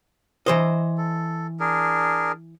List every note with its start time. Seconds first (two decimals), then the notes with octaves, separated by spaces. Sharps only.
0.46 E3 C5 D#5
0.98 A4
1.60 D4 G#4 A#4